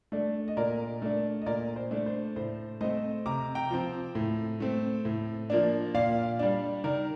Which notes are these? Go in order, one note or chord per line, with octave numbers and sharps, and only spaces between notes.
A3 D4
D#5
A#2 A#4 D5
A3 D4
D#5
A#2 A#4 D5
C5
A3 D4
C5
A2 C5
A3 C4 C5 D#5
C3 A#5 D6
G5 A#5
F3 C4
A2
A3 C4
A2
F3 A#3 D4
A#2 D5 F5
G3 D4
D#3 A#4 D5